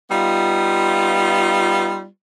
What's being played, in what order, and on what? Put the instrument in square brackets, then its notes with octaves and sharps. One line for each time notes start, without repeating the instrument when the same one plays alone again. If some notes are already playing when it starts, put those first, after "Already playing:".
[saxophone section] G3 B3 D#4 F4